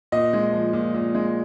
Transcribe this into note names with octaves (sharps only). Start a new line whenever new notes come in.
A#2 D#5
G#3
F3
A#2
A#2
G#3